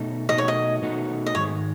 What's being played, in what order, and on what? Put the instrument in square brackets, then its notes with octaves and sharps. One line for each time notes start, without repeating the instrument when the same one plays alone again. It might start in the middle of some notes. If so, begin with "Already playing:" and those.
Already playing: [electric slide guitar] B2 A3 D#4
[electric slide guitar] B2 A3 D#4 F#4 [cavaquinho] D#5
[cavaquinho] C#5
D#5
[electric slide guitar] B2 A3 D#4 F#4
[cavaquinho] D#5
[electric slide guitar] G#2 D#3 G#3 [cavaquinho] C#5